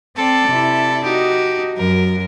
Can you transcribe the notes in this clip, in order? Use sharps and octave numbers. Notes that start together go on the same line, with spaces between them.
C4 A4 D5
C3 E4
D#4 F#4 G4
F#2 F#3 A#4